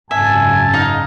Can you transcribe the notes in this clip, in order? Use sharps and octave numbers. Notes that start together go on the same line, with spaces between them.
G#1 F#2 C#3 E5 G#5 A5
D#4 F5